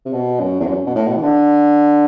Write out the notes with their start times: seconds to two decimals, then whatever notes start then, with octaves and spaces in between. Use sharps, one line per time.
0.05 C3
0.13 B2
0.40 F#2
0.60 E2
0.67 F#2
0.86 B2
0.95 A2
1.08 B2
1.16 E3
1.22 D3